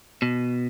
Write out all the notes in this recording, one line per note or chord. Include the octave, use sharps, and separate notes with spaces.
B2